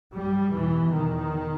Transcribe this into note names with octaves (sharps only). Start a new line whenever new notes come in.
G2 G3
E2 B2 E3
E2 B2 D#3